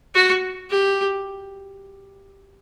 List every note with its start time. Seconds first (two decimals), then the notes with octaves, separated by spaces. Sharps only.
0.15 F#4
0.70 G4